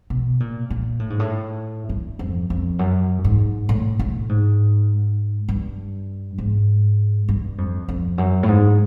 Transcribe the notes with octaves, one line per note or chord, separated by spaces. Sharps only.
B2
A#2
A#2
A2
G#2
A2
G2
F2
F2
F#2
G#2
A2
A2
G#2
G2
G#2
G2
F2
F2
F#2
A2
G#2